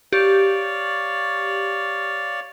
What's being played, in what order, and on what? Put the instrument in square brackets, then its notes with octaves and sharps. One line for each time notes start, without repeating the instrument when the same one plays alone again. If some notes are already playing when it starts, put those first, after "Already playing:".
[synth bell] G4 [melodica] C#5 D5 F5